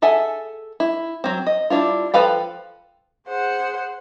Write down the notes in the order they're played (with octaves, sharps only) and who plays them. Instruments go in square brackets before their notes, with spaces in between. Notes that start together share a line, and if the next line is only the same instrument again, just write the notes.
[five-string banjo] G#4 A4 E5 F#5 G#5
E4
F#3 C4
D#5
G3 D4 E4 F4
F3 A4 B4 F5 G5
[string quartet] G#4 C5 F#5